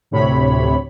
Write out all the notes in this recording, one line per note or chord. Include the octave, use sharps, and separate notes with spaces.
D2 A2 C3 C#5 B5